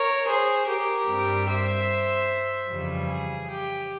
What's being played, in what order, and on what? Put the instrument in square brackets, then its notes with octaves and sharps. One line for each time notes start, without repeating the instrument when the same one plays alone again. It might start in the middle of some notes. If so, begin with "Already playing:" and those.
Already playing: [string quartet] A#4 C#5
G#4 C5
G4 A#4
G2 G3 C4
C5 E5
F2 C#3 E3 G3
G#4
G4